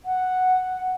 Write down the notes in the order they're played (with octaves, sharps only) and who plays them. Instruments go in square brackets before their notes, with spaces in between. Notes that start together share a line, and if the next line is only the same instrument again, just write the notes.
[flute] F#5